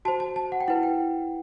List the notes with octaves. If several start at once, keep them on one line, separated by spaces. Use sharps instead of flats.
F#4 C5 A5
A5
A5
F#5
G5
E4 B4 F#5
G5